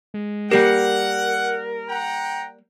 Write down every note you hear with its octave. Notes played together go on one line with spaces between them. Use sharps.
G#3
G3 A#3 G4 A#4 F#5
F#5 G5 A#5